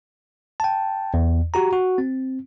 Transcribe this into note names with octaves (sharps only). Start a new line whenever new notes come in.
G5 A5
E2
F#4 G4 A#5
F#4
C4